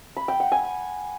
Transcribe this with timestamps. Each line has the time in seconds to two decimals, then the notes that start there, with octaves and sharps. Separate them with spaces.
0.17 B5
0.28 G5
0.40 F#5
0.52 G#5